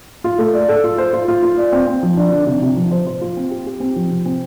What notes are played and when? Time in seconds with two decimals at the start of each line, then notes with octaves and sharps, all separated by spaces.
0.24 F4
0.38 A3
0.54 D5
0.68 A4
0.84 F4
0.98 C5
1.13 F4
1.28 F4
1.43 F4
1.58 D5
1.72 C4
1.87 C4
2.03 F3
2.17 D4
2.33 D3
2.47 C3
2.62 C3
2.77 F3
2.91 C5
3.07 C5
3.21 F4
3.37 C4
3.51 G4
3.66 G4
3.80 C4
3.96 F3
4.11 C3
4.26 C4